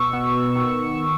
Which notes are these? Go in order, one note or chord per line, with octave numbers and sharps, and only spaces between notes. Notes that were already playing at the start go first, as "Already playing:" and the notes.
Already playing: B2 C#6 E6
B3
D#3